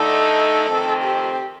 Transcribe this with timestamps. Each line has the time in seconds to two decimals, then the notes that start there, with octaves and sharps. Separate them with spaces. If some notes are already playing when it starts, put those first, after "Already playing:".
Already playing: D3 A3 D#4 A4
0.66 F2 D#3 A3 C4
1.03 G4